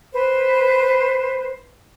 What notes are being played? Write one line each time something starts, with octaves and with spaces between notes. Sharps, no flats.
B4 C5